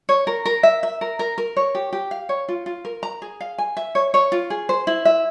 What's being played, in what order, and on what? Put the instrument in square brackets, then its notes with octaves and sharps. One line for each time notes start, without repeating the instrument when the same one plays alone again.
[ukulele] C#5
A#4
A#4
E5
E5
A#4
A#4
A#4
C#5
G4
G4
F5
C#5
F4
F4
A#4
A#5
G#4
F5
G#5
E5
C#5
C#5
F4
G#4
C5
E4
E5